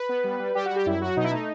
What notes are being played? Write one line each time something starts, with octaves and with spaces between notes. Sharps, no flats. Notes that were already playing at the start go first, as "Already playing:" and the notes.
Already playing: B4
B3
G3
G3
G3 G4
F#4
G3
G4
F#2 E4
F#3 F#4
B2 D#4
E4
A3 D#4